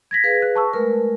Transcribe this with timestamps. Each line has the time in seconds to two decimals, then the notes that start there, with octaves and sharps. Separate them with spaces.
0.11 G#6 A#6 B6
0.24 G#4 B4 F5
0.42 F#6
0.55 A5 C#6 E6
0.73 G#3 A3 A#4 B4